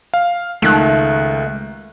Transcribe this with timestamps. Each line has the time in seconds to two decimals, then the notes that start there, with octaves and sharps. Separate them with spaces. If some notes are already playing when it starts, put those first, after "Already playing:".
0.14 F5
0.62 C#2 D#3 A3 F#6